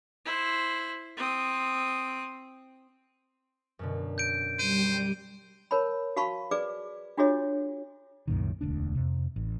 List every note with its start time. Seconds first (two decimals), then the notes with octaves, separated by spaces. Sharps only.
0.25 E4 C5
1.17 C4 D#6
3.79 F#2 B2 D3
4.18 G6 D7
4.59 G3 C5 D#7
5.71 A#4 C#5 A5 B5
6.16 F#4 F5 A5 B5 C#6
6.51 G#4 B4 D5 D6
7.18 D4 F4 F#4 G#4 C#5 D#5
8.28 C2 F#2 A#2 D#3
8.61 E1 D2 D4
8.95 F2 C3
9.36 A1